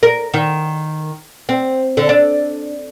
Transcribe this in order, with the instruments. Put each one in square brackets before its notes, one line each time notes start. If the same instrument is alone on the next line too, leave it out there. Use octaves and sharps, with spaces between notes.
[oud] A#4
D#3
C4
D3
D4